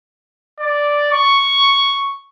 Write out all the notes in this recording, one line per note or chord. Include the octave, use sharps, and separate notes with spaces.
D5
C#6